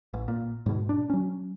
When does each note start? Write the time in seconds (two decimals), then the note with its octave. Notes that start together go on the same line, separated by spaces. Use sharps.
0.13 A1
0.28 A#2
0.66 G#2 B2
0.89 D4
1.10 F#3 C#4